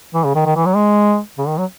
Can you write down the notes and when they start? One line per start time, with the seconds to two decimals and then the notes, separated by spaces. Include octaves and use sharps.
0.14 E3
0.24 C#3
0.35 D#3
0.45 D#3
0.56 E3
0.65 F#3
0.75 G#3
1.38 C#3
1.47 D#3
1.58 F#3